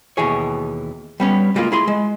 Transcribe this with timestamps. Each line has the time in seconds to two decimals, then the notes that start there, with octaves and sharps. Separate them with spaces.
0.17 D#2 B2 E3 G#4 C#5
1.20 G3 B3 C#4
1.55 C#3 G3 G#3 A#3 F4
1.72 E4 G#4 C6
1.88 G#3